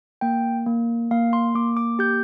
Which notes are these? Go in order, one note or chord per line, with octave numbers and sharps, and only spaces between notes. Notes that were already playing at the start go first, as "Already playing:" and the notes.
A#3 G5
A#3
A#3 F5
C6
A#3 D6
D6
G4 G6